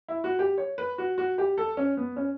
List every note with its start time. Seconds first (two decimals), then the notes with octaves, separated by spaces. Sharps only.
0.08 E4
0.24 F#4
0.39 G4
0.58 C#5
0.78 B4
0.98 F#4
1.18 F#4
1.38 G4
1.58 A4
1.77 C#4
1.97 B3
2.16 C#4